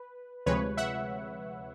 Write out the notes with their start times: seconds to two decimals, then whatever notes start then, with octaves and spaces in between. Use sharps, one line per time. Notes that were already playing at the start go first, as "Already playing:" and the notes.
Already playing: B4
0.46 D2 C3 F3 G#3 B4 C#5
0.77 E5 F#5